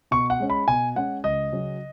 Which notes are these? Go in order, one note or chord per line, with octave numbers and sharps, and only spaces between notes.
B2 C#6
F#5
G#3 C#4
B5
B2 G#5
G#3 C#4 F#5
C#2 D#5
C#3 F#3 C#4